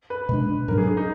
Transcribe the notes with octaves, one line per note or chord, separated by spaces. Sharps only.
B4
B2 G#3 D4
G#2 F#3 D4 A#4
G#4
G#4
D#4